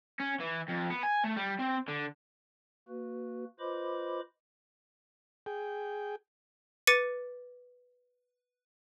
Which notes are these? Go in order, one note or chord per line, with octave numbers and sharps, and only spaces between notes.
C#4
E3
F2
B3
G#5
A3
G3
C4
D3
A#3 F#4 B4
F4 B4 C5 D#5 B5 D6
G#4 G5
B4 D6 A6 C#7 D#7